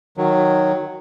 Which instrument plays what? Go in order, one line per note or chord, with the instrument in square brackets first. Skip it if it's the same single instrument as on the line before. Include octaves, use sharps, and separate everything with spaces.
[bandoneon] D#3 F#3